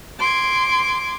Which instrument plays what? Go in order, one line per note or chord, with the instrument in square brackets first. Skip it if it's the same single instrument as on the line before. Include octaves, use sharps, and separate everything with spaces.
[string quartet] C6 D6 G#6